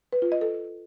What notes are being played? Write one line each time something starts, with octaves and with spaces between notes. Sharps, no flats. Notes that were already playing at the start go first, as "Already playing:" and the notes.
B4
F4
D#5
A4